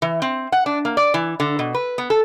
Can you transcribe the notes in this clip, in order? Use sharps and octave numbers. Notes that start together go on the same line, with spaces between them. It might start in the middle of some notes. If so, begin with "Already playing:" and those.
E3
C4
F#5
D4
A#3
D5
E3
D3
B2
B4
B3
A4